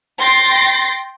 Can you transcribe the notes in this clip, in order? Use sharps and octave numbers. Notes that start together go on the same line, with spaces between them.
G5 C6 A6 A#6 C7